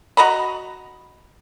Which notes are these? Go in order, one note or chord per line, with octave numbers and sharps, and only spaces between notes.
F#4 D#5 A#5 B5